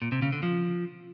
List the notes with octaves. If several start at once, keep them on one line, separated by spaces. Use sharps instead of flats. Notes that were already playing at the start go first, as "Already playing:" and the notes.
A#2
C3
C#3
D3
F3